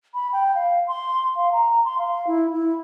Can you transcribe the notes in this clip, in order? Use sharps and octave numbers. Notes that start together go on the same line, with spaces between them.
B5
G5
F5
C6
F5
A#5
C6
F5
E4
E4